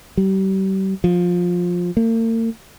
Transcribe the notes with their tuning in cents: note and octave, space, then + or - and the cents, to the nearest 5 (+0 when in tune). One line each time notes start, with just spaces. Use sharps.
G3 -35
F3 +15
A#3 -45